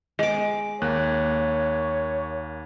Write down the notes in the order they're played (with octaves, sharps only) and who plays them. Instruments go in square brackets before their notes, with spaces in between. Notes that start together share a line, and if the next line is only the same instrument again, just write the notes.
[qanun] G#3 D6 [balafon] D#5
[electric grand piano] D#2 A#3 F#6 [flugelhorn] C#5